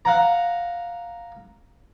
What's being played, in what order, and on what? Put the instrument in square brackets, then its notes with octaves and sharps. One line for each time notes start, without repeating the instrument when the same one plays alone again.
[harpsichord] F5 F#5 A#5